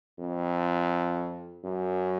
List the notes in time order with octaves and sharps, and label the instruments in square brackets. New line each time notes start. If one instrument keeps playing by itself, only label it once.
[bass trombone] F2
F#2